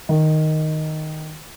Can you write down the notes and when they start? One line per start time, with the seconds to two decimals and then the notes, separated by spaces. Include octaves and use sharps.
0.09 D#3